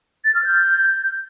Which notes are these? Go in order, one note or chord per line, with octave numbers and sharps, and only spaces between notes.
A6
F6
G6